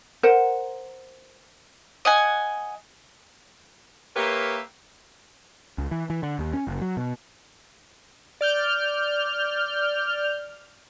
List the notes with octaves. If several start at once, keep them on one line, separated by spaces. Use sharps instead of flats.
A#4 C5 F#5
D#5 F#5 G#5
A#3 G4 A#4 B4 C#5 E5
C#2
E3
E3
D3
D#2
C#4
F#1
F#3
B2
D5 F6 G6